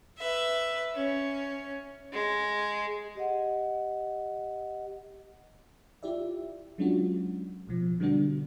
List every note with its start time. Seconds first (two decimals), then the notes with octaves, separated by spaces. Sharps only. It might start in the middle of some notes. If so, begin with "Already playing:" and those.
0.18 B4 E5
0.95 C#4
2.13 G#3
3.15 G4 D#5 F#5
6.03 E4 F4 G4 D5 E5
6.78 F#3 G#3 C#4 D4 F4 F#4
7.67 A1 B2 F3
7.99 B2 D3 G3 B3 D4 F#4